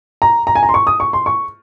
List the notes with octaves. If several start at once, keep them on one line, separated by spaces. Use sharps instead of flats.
A#5
A#5
G#5
A#5
C6
C#6
D#6
C#6
C6
C#6